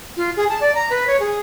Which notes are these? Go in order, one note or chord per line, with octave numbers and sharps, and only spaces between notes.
F4
G#4
A5
D5
A#5
B4
C#5
G#4